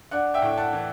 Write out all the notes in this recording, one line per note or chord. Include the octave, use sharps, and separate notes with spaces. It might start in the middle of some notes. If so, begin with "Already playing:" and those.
D4 F#5
E5 G5
A2
F#5 A5
E3